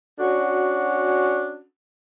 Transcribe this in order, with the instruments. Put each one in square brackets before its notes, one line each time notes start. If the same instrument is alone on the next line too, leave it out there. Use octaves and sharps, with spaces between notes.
[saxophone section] C#4 D4 F#4